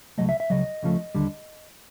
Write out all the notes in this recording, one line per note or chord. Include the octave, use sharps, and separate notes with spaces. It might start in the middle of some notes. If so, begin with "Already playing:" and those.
C#2 B2 F#3 A3 D#5
E5
E5
C#2 C#3 F#3 D#5
C#2 C#3 F3 A3
D#2 D3 G3